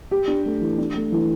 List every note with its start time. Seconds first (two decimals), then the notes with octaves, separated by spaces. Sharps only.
0.11 G4
0.28 D4
0.45 A3
0.61 E3
0.78 D4
0.95 A3
1.12 E3